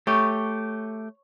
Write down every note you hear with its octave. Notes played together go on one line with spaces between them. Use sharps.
A3 G4 C#5